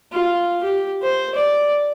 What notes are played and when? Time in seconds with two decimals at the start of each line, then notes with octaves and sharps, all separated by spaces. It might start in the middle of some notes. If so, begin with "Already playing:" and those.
0.12 F4
0.63 G4
1.02 C5
1.35 D5